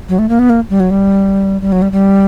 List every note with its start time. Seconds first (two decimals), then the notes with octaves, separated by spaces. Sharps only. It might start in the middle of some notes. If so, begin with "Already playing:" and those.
0.09 F#3
0.19 A3
0.29 A#3
0.39 B3
0.50 A#3
0.70 G3
0.80 F#3
0.91 G3
1.61 G3
1.72 F#3
1.82 G3
1.92 G3